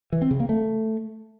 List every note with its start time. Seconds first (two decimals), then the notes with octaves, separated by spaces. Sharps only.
0.12 E3
0.22 C4
0.31 C#3
0.40 A#3
0.49 A3